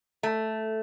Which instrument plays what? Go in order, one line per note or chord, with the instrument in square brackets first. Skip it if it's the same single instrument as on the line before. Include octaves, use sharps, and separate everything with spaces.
[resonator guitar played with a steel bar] A3